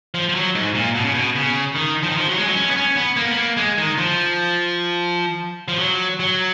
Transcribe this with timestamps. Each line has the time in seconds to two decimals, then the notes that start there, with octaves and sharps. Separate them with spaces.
0.14 F3
0.29 F3
0.35 F#3
0.55 G#2
0.75 A#2
0.95 B2
1.05 C#3
1.14 B2
1.35 C#3
1.75 D#3
2.03 F3
2.09 D#3
2.17 F3
2.29 F#3
2.38 G#3
2.46 F#3
2.56 C#4
2.71 B3
2.77 C#4
2.96 B3
3.17 A#3
3.27 B3
3.37 A#3
3.57 G#3
3.78 D#3
3.97 F3
5.68 F3
5.79 F#3
6.20 F#3